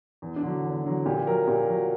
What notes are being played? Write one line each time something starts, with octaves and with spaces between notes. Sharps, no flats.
E2
D4
D3 F#3
E2
D3 F#3
A#2 G4
F#3 A#4
A#2 G4
F#3